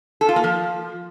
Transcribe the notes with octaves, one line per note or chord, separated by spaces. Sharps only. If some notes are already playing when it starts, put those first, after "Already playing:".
A4
F4
A#3
F3